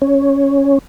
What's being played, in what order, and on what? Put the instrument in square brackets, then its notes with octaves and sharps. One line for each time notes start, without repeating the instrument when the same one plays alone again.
[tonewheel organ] C#4